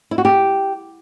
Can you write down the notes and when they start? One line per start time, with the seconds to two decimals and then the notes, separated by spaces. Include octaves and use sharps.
0.11 E4
0.18 F#4
0.25 G4